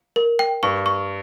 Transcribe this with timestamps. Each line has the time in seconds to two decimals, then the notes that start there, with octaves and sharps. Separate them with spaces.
0.16 A#4
0.39 G5
0.63 G2 C#6
0.86 C#6